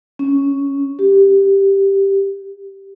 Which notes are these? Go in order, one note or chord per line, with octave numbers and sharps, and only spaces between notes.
C#4
G4